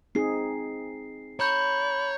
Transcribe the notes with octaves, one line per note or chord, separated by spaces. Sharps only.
C4 D#4 G#4 C7
C#5 A#5 B5 G6